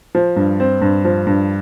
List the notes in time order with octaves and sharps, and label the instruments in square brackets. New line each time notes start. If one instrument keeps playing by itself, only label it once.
[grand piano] F3
G2
C4
G2
F3
G2